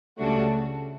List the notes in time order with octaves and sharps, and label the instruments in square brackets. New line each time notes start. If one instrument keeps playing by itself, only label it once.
[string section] C#2 C#3 G3 D4 F#4 [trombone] A3